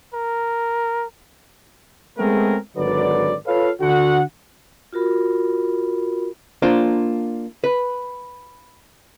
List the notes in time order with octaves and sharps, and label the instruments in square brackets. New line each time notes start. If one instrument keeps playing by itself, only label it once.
[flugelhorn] A#4
[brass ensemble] G#3 A3 B3 C4 G#4 A#4
G#1 D3 F#3 B4 D5
F4 A4 B4 C#5 F5
D3 F#4 F#5
[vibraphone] F4 F#4 A#4 B5
[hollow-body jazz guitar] A#3 D4 F4 C5
B4